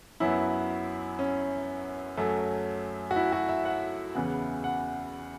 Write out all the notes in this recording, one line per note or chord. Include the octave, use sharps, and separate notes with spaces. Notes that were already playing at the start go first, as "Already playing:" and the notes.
F#2 F#3 B3 E4
C#4
F#2 F#3 A3
F#4
E4
F#4
E5
F#5
E2 C#3 E3 B3
F#5